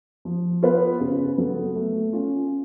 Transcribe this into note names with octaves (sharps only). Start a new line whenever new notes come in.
F3
B3 F4 B4
C#3
F#3 B3 F#4 A4
A3
C#4 F4